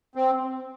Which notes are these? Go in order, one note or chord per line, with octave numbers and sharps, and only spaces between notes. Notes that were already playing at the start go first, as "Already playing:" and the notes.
C4